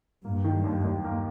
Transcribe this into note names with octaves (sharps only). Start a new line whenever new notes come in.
G2 A#3
D#3
D#2
D#2
A#3